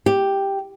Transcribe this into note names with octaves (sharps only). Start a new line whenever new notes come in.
G4